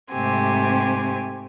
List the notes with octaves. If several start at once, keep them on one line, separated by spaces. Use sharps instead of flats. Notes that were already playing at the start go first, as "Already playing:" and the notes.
G#2 C3 A3 C4 G4 G#5